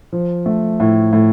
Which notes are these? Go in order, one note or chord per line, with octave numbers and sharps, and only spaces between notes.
F3
A3
A2
A2